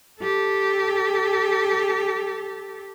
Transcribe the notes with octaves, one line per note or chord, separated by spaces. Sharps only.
G4 A4